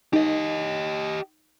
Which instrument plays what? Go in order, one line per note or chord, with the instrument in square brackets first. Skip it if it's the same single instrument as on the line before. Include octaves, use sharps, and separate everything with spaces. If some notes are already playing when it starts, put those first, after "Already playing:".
[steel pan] D#4 [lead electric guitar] G4 D#5